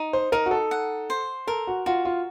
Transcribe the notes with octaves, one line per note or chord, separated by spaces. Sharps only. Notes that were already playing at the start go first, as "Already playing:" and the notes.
Already playing: D#4
C5
D#4 A#4
F#4
A4
F#5
C5
A4 A#4
F#4
F4 F#4
F4